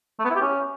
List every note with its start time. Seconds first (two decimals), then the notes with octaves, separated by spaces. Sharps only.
0.19 A3
0.25 B3
0.30 E4
0.36 G4
0.41 C#4